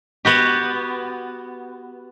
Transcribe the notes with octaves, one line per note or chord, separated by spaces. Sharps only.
B3 F#4 G4